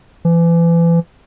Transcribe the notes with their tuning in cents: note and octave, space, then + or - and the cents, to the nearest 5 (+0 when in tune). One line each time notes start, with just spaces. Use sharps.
E3 +35